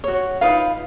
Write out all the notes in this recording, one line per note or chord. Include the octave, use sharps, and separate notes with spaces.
F#4 C#5
D#4 F4 B4 F5